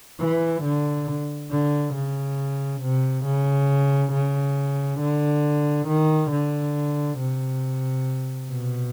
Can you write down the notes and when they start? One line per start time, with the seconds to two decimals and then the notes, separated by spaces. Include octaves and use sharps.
0.20 E3
0.64 D3
1.51 D3
1.94 C#3
2.82 C3
3.25 C#3
4.13 C#3
5.00 D3
5.88 D#3
6.31 D3
7.19 C3
8.50 B2